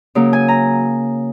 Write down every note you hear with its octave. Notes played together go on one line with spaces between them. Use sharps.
C#3 F#3 A#3
G#5
A#5